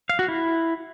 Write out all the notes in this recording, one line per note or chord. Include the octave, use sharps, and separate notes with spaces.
F5
F#4
E4